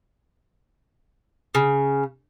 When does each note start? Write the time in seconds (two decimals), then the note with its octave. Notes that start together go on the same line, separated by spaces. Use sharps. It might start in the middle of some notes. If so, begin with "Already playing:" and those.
1.55 C#3